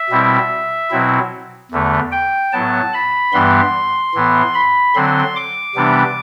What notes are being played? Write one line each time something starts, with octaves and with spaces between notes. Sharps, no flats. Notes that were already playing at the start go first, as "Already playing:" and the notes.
Already playing: E5
B2 G3 C4 E4
B2 F#3 C4 E4
E2 D3 A3
G5
A2 F#3 B3 A5
B5
G2 E3 G3 B3 C6
A2 E3 B3
B5
D3 F#3 C4 C6
D6
C3 E3 G3 B3 D4